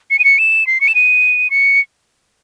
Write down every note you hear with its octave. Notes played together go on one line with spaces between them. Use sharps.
C#7
D#7
C#7
E7
C7
C#7
E7
D#7
C#7